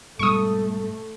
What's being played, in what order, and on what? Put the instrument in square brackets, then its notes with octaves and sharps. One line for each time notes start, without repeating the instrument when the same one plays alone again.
[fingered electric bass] G#2 B2 G3 [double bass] A3 [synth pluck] C#6 D#6